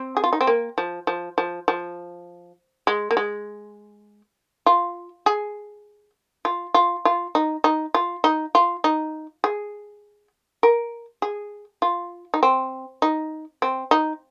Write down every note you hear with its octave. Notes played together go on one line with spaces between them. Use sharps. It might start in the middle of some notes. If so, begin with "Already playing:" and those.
Already playing: C4
G#4
F4
D#4
C4
A#3
F3
F3
F3
F3
G#3
A#3
G#3
F4
G#4
F4
F4
F4
D#4
D#4
F4
D#4
F4
D#4
G#4
A#4
G#4
F4
D#4
C4
D#4
C4
D#4